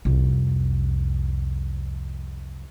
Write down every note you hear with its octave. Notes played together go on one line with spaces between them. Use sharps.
C2 F2